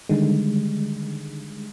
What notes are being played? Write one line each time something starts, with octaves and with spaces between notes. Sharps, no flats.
D3 D#3 G3 G#3